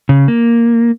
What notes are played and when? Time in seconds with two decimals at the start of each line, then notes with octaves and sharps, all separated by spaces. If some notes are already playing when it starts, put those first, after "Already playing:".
0.09 C#3
0.28 A#3